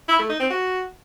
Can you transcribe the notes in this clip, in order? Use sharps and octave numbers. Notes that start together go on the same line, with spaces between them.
E4
A3
D#4
C4
F#4